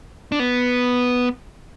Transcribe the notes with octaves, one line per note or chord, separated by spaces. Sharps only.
D4
B3